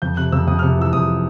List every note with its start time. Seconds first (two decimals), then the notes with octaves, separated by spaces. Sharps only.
0.02 F2 G6
0.17 C3 F#6
0.32 F2 E6
0.47 F2 D#6
0.59 C3 F6
0.78 E3 E6
0.93 F2 D#6